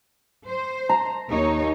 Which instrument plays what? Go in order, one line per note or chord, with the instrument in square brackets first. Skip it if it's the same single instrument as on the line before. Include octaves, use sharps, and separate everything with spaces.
[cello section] C5
[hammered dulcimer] A#5
[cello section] D#2 D#4 C#5